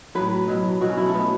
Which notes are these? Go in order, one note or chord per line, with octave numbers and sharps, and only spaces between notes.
A2 F#3 B4
B2 F#3
B2 F#3 F#4
C#4
E4
A3
B2 F#3 B3